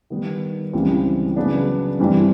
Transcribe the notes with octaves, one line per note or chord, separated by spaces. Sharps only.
D#3 G3 B3
C#2 C#3 E3 G3 C4
C#3 F#3 B3 D4
G2 E3 G3 C4